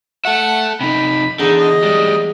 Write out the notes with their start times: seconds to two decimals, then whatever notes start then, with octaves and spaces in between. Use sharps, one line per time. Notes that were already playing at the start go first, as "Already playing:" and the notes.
0.25 A4 E5 F#5
0.81 C3 D#4 B5
1.40 E2 D3 D#4
1.59 D#5
1.83 G3 G#3